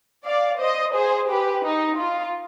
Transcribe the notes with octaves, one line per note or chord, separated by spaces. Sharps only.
D5 F5
C5 D#5
G#4 C5
G4 B4
D#4
F4